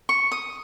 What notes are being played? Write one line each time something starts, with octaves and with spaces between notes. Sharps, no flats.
C#6
D#6